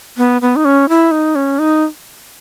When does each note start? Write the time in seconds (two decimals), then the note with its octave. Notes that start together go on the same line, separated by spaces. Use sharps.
0.18 B3
0.42 B3
0.56 D#4
0.65 C#4
0.89 E4
1.11 D#4
1.35 C#4
1.59 D#4